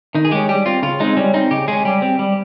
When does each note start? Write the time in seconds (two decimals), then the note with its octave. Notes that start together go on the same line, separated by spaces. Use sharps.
0.15 D#3 D#4
0.25 G#4
0.31 G#3 C#4 G4
0.49 G3 G4
0.66 C4 F4
0.83 C#3 F4
1.00 G#3 C4 D#4
1.17 G3 C#4
1.34 C4 D#4
1.51 C#3 G4
1.68 G#3 C#4 G#4
1.85 G3 G4
2.02 C4
2.19 G3